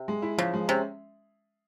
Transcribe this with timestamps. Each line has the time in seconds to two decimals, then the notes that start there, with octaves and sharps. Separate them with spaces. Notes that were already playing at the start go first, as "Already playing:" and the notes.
Already playing: C3
0.08 G#3
0.22 E4
0.38 C#3 F3
0.54 G#3
0.68 C3 C#4